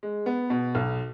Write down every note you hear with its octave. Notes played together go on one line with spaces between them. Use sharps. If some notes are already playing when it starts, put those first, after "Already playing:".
G#3
B3
B2
B1